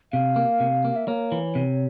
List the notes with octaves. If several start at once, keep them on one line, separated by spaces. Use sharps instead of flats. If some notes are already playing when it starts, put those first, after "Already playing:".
C3 F5
A#3
C3
A#3
E5
A#3 C#5
E3
C3